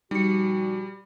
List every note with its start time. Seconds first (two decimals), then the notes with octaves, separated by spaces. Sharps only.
0.11 A#2 F3 G3 D#4 F#4 C#7